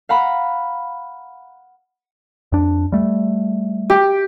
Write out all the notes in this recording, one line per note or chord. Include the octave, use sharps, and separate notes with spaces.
F5 F#5 A#5 B5
F2 D4
G3 A3
G4